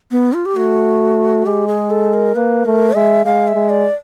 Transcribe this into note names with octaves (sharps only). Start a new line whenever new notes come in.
B3
F4
G4
A3 F#4
G#3 G4
G#4
A4
A#4
A#3 B4
A3 A#4
G#3 E5
G#3 F5
E5
G#3
D5